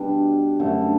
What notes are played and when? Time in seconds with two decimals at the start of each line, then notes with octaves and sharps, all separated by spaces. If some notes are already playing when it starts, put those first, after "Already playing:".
Already playing: B2 G3 D4
0.60 F#2 D3 A3